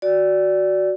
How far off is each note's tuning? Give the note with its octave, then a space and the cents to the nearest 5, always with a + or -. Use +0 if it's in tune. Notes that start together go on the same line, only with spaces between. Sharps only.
F#4 +0 D5 -10